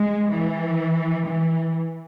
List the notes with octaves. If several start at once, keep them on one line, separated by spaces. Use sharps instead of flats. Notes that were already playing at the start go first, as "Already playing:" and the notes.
Already playing: G#3
E3
E3